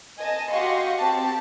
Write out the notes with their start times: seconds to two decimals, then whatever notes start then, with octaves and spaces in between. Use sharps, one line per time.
0.17 D#5 G#5 A5
0.50 F#4 G4 D#5 F5 C6 C#6
0.98 C4 G4 A5